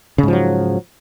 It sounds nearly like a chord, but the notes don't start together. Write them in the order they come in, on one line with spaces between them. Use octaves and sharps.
C#3 G#2 F3 F#3